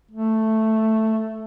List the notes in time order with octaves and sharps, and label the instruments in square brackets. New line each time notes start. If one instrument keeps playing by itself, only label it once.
[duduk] A3